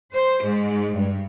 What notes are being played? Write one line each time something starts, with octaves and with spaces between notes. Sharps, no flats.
C5
G#2
G2